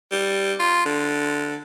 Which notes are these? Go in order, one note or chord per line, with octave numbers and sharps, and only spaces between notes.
G3
F4
D3